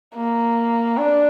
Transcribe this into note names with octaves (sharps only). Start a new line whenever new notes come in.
A#3
D4